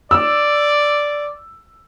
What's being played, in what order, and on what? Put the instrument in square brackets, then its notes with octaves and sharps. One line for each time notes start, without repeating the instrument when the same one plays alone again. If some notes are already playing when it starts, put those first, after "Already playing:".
[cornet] D5 [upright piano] E6